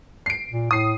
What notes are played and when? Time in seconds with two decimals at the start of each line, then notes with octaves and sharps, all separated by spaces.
0.26 C7 D7
0.52 A#2
0.71 A2 D#6 C7